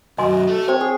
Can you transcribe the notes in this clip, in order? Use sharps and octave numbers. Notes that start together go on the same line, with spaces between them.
B1 F#2 F#4 D#5 G#5 C6
A3 A4
C4 C5 C#5
G#4